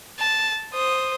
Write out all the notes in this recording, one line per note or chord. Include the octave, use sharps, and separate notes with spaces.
A5
C5 D#6